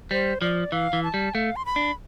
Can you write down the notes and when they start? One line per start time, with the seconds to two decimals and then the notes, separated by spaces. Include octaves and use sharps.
0.11 G3 C5
0.41 F3 D5
0.72 E3 F5
0.93 E3
1.04 A5
1.14 G3
1.34 A3 F5
1.56 C6
1.66 B5
1.76 D4